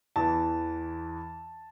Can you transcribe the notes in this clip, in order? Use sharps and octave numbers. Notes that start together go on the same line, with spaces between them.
E2 E3 A5